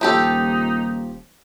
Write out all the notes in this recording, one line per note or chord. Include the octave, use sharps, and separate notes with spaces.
D#1 F3 D#4 G4 A4